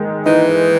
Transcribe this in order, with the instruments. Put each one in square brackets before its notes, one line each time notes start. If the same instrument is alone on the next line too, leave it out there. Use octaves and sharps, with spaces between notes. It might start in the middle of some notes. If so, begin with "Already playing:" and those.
Already playing: [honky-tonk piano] D#3 G#3
[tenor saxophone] E3 [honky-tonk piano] D#4